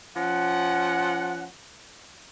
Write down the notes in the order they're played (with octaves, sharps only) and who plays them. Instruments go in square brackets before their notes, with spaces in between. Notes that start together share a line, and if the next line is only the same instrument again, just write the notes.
[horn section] F3 C#4 F#5